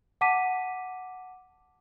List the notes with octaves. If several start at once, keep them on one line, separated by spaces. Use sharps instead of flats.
F#5 A5 D6 B6 D#7